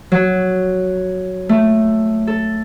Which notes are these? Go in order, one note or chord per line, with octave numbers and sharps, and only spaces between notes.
F#3
A3
A4